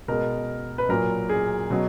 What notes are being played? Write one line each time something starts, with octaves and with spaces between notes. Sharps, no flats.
B2 G#3 A#4
B4
A#2 F#3 A#4
G#4
B2 F#3